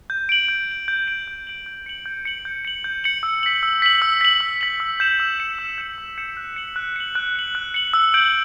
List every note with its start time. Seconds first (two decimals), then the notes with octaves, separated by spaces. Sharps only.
0.10 G6
0.29 D7 F#7
0.48 G6
0.69 D7 F#7
0.88 G6
1.07 D7 F#7
1.28 G6
1.47 D7 F#7
1.66 G6
1.86 C#7 F#7
2.06 G6
2.25 C#7 F#7
2.45 G6
2.65 C#7 F#7
2.84 G6
3.04 C#7 F#7
3.23 E6
3.43 B6 F#7
3.63 E6
3.82 B6 F#7
4.02 E6
4.21 B6 F#7
4.41 E6
4.61 B6 F#7
4.80 E6
5.00 G6 C#7 E7
5.20 E6
5.39 G6 C#7 E7
5.59 E6
5.78 G6 C#7 E7
5.98 E6
6.18 G6 C#7 E7
6.37 F#6
6.56 C#7 F#7
6.76 F#6
6.96 C#7 F#7
7.15 F#6
7.36 C#7 F#7
7.55 F#6
7.74 C#7 F#7
7.94 E6
8.14 G6 D7 F#7